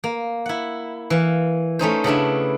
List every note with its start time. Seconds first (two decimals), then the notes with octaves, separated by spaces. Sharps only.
0.04 A#3
0.46 E4 F#5
1.10 E3 F5
1.79 A3 C#4 D#4 C5
2.04 C#3 B3 D4 E4